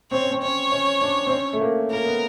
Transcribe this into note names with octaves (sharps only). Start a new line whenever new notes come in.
C4 C#5
C#4
C4
C#4 C#5
C#4
D4
C4
C#4
A3
A#3
A#3 A#4
B3